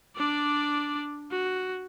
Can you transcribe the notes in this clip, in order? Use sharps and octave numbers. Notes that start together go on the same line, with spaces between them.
D4 D5
F#4